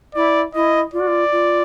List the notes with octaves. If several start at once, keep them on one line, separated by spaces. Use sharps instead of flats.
E4 D5
E4 D#5
F4 D5
F#4
F4
F4